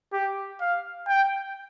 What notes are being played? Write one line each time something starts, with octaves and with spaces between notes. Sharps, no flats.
G4
F5
G5